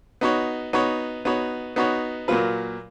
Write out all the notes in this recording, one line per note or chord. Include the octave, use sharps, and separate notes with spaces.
B3 D#4 F#4 C#5
B3 D#4 F#4 C#5
B3 D#4 F#4 C#5
B3 D#4 F#4 C#5
A#2 F#3 A#3 F4 B4